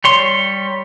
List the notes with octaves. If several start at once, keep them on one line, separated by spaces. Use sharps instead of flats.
G3 C#5 C6